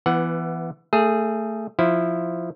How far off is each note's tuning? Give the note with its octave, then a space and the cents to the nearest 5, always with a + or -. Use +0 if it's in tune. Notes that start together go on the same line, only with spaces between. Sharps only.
E3 +20 B3 +0 F#5 +5
A3 +20 G#4 +0
F3 +0 E4 +0